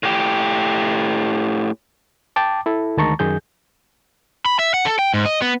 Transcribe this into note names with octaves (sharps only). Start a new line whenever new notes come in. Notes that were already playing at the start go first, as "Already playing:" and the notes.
A2 G4
G5 A5 D6
E4 A4
D2 D#3 G#3 A5 A#5 C#6
F#2 D#3 G#4 G6
B5
E5
F#5
A4
G5
G#2
D#5
B3